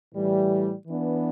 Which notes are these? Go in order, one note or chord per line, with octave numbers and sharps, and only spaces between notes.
A2 E3 G3
E3 B3 D4